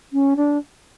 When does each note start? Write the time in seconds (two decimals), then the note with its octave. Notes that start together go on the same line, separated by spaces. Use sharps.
0.12 C#4
0.36 D4